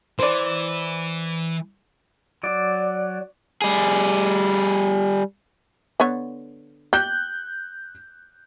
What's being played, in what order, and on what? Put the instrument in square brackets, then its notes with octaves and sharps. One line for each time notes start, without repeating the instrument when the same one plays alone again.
[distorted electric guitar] E3 [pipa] C5 D5
[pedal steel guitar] F#3 D5
[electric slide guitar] G3 G#4
[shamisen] D3 B3 C#5
[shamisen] G4 [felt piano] F#6 G6